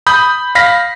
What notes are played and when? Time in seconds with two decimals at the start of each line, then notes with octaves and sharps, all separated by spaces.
0.07 B5 D#6 G6
0.55 F5 B5 A#6 B6